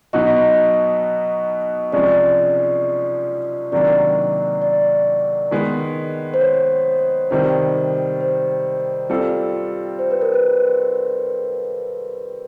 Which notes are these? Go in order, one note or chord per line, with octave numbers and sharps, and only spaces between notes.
B2 F#3 B3 D#4 F#4 D#5
C3 F3 G#3 C#4 D5
C3 D#3 F#3 A#3 D4 D5
D5
D#3 G#3 B3
C5
C#5
C3 D#3 G3 C5
C5
G3 C4 F4 A4
C5
B4
A#4
B4